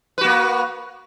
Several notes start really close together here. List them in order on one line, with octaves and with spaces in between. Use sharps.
B4 F#4 A#3